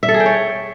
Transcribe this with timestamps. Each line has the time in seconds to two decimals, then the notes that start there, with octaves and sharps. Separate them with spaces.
0.03 E5
0.08 A4
0.14 G#4
0.20 G5
0.26 C#5